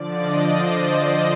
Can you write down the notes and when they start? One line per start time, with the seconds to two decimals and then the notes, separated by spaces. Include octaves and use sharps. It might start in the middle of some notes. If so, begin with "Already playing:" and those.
Already playing: D3 F3 D5
0.20 D#5
0.48 C5